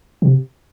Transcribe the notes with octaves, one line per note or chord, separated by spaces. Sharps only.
C3